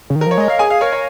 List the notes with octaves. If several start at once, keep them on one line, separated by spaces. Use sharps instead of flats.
C#3
D#3
A#4
F3 C#5
G#3 D#5
A#4 F5
G#4 G#5
F5
A#4 C#5
C#5